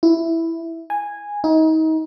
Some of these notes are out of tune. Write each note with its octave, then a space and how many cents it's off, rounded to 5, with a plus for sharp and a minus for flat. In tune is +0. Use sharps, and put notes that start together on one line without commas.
E4 +0
G#5 -10
D#4 +30